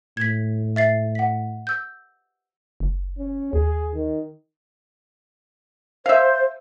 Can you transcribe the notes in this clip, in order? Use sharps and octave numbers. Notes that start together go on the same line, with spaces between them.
A2 G#6 B6
E5 A6 C7
F#5 B6
E6 G6
F#1
C#4
D#2 G#4
D#3
C5 E5 F5